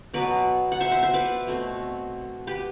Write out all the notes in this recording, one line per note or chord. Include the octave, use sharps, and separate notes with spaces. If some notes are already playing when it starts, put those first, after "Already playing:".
B2 F#3 B3 B4 D5
F#5
C5 E5
C5 E5
C5 E5
B4 D5
B2 A3 C4
G4 B4